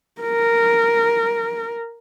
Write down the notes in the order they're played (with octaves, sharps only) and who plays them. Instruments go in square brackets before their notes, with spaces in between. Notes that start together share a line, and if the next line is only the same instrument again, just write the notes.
[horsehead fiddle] A#4